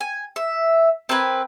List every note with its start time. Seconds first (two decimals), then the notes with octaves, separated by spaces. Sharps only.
0.01 G#5
0.36 E5
1.09 C4 A#4 B4 G#5